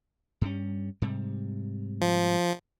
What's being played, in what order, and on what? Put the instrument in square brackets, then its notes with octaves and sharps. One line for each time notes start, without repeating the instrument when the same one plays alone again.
[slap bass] G2 G3 C#4
G#2 C3 G3
[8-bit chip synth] F3